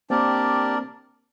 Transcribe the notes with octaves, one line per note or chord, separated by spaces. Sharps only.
A#3 C4 D4 G4 A#4 D5